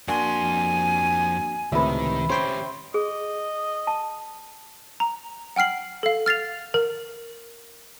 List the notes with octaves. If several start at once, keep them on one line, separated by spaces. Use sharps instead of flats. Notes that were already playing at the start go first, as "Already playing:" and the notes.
F2 A#3 D4 F#4 G#5 C6
C#2 A2 C3 D#3 B4 E5
C#4 G4 C5 C#5 G5 C6
G#4 D#5
A5
A#5
F#5 G5 F6 C7 F#7
A4 F5
F6 A6 C7 F7
A#4